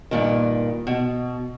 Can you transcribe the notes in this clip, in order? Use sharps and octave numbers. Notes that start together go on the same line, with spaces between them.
G2 A#2 D#3
B2